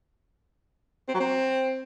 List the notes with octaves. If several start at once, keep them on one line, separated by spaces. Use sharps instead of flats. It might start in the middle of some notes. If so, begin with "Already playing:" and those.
C4
F#3
C4